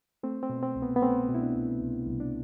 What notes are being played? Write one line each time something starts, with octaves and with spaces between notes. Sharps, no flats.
A3 C4
C4
B2
C4
C2
B3
B3
A3 C4
B2
E4
D4
C2
C2
C2
D4